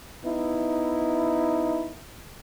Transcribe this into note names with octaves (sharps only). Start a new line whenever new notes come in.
B3 D#4 E4